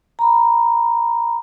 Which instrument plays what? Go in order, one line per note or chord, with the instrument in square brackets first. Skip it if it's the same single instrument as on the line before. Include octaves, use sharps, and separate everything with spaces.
[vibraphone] A#5 B5